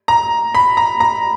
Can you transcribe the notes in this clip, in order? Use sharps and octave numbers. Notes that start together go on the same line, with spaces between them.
A#5
B5
A#5
A#5